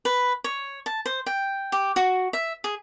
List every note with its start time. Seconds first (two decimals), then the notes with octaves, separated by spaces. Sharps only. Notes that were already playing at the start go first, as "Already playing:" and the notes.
0.05 B4
0.44 C#5
0.86 A5
1.06 C5
1.26 G5
1.72 G4
1.96 F#4
2.33 E5
2.64 G#4